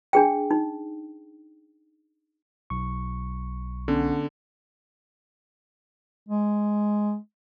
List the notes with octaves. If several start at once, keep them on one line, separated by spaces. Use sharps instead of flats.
D4 G#4 G5
D#4
B1 C#6
D3 B3 C#4
G#3